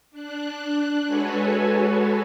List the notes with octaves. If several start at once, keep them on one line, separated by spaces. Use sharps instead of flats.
D4 F#6
G#3 F#4 A4 B4 C#5 G#5